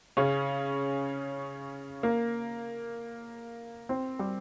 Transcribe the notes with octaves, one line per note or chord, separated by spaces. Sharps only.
C#3 C#4
A#3
C4
G3 G4